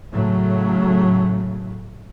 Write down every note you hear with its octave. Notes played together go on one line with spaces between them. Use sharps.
A2 C#3 F#3 A3